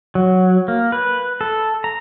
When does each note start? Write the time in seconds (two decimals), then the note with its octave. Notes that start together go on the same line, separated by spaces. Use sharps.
0.15 F#3
0.68 A#3
0.92 B4
1.41 A4
1.84 A#5